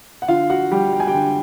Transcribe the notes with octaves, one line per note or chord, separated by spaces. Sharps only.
F#5
D3 F4 F5
F#4 F#5
G3 G4 G5
G5
G#5
G4 G5
D3